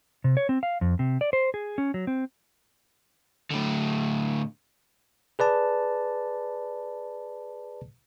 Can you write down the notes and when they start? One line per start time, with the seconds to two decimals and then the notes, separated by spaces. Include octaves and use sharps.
0.24 C3
0.37 C#5
0.49 C4
0.63 F5
0.81 F2
0.99 C3
1.21 D5
1.33 C5
1.54 G#4
1.78 C#4
1.94 F#3
2.07 C4
3.51 A2 D3
5.39 G#4 B4 D5 A5